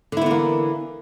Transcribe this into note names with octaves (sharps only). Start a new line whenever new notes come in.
D3 E3 A#3 B3 E4